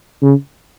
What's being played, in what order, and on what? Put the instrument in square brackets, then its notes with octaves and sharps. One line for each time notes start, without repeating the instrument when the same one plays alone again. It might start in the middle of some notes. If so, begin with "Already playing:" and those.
[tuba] C#3